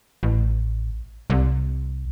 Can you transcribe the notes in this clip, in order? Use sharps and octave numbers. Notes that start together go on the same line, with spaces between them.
A1
C2